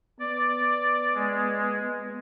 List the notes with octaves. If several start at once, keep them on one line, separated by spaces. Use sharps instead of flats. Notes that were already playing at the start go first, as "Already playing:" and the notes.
B3 D5
G#3